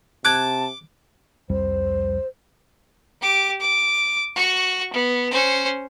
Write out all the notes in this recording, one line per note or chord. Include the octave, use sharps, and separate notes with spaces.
C3 A5 D6 F#6 G#6
C2 F2 G3 C5
G4 D6
D6
F#4 C#6
B3
C#4 C5